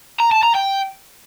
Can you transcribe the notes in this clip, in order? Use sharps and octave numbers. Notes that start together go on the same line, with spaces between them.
A#5
A5
A#5
G5